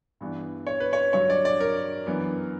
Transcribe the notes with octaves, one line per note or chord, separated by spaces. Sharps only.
G2 E3 B3 D4
C#5
B4
C#5
G2 D3 F#3 C#5
D5
D5
A#4
F#2 E3 B3 D4